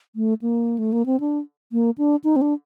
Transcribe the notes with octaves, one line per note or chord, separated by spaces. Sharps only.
A3
A#3
A3
A#3
C4
D4
A#3
D4
D#4
C4
D4